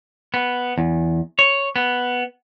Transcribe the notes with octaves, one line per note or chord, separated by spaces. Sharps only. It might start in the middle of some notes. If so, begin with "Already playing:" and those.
B3
E2
C#5
B3